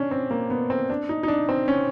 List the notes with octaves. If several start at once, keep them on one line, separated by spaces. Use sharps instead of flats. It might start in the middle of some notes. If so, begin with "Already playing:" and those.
Already playing: C#4 D4
C4
A#3
B3
C4
D4
D#4
D#4
D4
C4
C#4